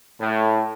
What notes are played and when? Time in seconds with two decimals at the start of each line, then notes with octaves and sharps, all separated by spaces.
0.20 A2